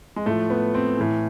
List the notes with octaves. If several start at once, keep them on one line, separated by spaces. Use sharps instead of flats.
G#3
A2 F3 A3
B3
C4
A2 E3